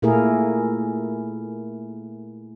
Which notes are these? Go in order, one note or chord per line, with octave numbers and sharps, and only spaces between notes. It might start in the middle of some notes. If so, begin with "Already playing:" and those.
A#2 A3 A#3 E4 G#4 A#4